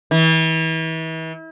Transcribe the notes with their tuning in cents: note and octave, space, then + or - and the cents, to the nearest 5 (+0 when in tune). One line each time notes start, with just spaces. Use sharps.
E3 -35